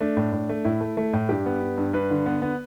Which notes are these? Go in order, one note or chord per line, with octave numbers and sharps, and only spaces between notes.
A3 D4
A2
A2
A3
A2 E4
A3
A3
A2
G2 G4
B3
G2
G2
G2 B4
D3
B3
B3